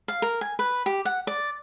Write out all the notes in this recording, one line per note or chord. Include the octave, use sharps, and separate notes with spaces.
F5
A#4
G#5
B4
G4
F#5
D5